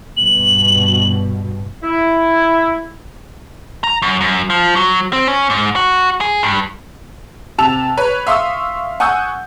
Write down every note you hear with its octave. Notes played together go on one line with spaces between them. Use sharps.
G2 B2 F#7
E4
A#5
F#2
F#2
F3
F#3
C4
C#4
G#2
F#4
G#4
G2
C3 A5 E6 F7
B4 C#5
E5 F5 C6 C#6 D#6 E6
F#5 G#5 C#6 D#6 E6 G6